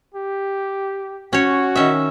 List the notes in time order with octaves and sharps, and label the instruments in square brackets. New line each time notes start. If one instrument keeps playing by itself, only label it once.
[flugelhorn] G4
[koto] C#4 C#5 [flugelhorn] F#4
[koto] D#3 C#4 E5